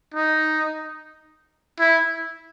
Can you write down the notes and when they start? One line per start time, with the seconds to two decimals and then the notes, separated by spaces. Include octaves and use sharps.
0.14 D#4
1.80 E4